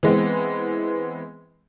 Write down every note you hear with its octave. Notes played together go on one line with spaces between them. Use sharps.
E3 G#3 B3 C4